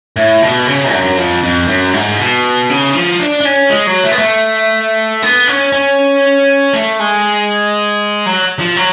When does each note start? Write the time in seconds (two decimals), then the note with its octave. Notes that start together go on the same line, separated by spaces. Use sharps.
0.16 A2
0.42 B2
0.67 C#3
0.92 F#2
1.17 F2
1.43 F2
1.67 F#2
1.93 G#2
2.19 B2
2.70 C#3
2.95 F3
3.20 D4
3.41 D4
3.45 C#4
3.70 G#3
3.87 F#3
4.04 A3
4.11 B3
4.18 A3
5.22 B3
5.48 C#4
5.72 C#4
6.73 A3
7.00 G#3
8.26 F#3
8.59 F3
8.77 F#3